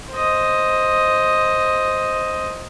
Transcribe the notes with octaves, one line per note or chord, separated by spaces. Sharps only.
C5 D#5